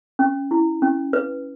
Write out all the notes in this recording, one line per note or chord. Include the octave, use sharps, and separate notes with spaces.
C#4
E4
C#4
B4